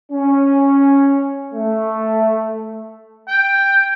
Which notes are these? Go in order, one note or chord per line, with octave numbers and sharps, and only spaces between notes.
C#4
A3
G5